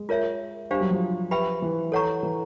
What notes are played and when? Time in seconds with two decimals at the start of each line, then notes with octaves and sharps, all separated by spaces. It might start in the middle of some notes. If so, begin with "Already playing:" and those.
Already playing: G#3
0.09 F4 A#4 C#5 E5
0.70 G3 D4 G4 C5 F5
0.81 F#3
0.91 F3
1.31 G4 B4 E5 G5 B5
1.62 E3
1.92 A4 C#5 F#5 A#5 C#6
2.23 E3